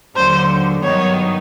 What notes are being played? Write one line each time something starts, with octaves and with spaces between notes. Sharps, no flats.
D#2 D3 F#3 C5
G2 D#3 F#3 B3 D#4 C#5